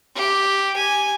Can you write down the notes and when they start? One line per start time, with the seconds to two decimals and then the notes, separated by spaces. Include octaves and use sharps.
0.15 G4
0.76 G#5